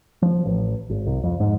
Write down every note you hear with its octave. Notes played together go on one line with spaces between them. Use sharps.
F3
A1
G#1
C2
F2
G#2